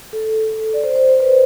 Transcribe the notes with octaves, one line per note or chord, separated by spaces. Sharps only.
A4
D5
C5
C5
C5
B4